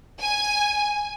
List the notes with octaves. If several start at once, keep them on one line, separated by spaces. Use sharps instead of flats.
G#5